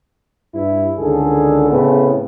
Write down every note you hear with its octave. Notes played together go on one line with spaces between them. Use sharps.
G2 E4
C#2 D3 D#3 G#4 A4
A2 C#3 B3 C4